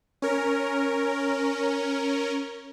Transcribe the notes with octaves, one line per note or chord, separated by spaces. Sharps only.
C#4 A#4